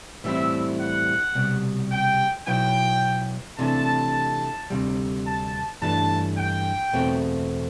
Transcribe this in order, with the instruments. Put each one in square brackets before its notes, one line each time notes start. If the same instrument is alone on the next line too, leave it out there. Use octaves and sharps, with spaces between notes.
[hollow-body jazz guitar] A2 E3 G3 C4 E4 [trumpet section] E5
[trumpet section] F#5
[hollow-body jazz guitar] C2 B2 G3
[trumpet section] G5
[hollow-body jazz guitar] B1 B2 F#3 B3 E4 [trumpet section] G5
[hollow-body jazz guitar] C3 E3 A3 D4 [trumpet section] A5
[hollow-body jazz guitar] D2 C3 G3
[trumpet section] A5
[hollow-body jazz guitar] G2 E3 A3 D4 [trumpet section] A5
[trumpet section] G5
[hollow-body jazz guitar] E2 B2 A3 C4 F#4